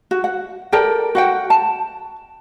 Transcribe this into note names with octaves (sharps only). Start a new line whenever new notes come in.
F#4
F#5
A4 A#4 D5 G5
F#4 F#5 G5
A5